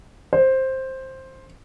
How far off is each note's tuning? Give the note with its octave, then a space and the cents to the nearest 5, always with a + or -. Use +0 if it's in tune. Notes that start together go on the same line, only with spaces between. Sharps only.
C5 +10